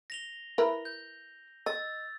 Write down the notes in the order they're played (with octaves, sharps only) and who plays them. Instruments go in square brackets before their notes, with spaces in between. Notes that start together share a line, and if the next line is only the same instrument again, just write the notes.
[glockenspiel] A#6 F7 G7
[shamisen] E4 A#4 B4
[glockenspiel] G6
[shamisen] D#5 [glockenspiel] E6 A6